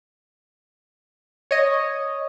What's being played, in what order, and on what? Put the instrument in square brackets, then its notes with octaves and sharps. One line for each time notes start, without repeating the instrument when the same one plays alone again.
[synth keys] C#5 D#5